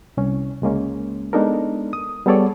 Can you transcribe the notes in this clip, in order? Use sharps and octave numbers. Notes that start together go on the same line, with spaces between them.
C2 C#4
C#2 G#3 A#3 C#4
G#3 B3 D4 D#4 A4 A#4
D#6
G3 B3 G#4 A4 C#5 D5